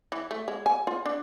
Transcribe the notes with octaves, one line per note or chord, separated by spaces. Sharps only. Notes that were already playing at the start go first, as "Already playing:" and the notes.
E3
A3
G#3
G#5
F4
D4